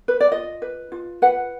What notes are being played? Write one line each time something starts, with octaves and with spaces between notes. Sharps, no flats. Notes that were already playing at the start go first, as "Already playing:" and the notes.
B4
D5
F4 D#5
B4
F4
B4 F#5